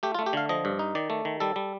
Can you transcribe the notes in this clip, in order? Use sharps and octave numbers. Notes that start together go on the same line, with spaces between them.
A3 G4
F4
A3
G4
D3 F5
F3 D#5
G2
D#4
D#3 D5
A3
D#3
G3 A4
G3